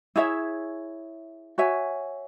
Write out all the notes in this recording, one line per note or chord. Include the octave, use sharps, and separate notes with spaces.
E4 G#4 C#5 E5
F#4 C#5 E5 G#5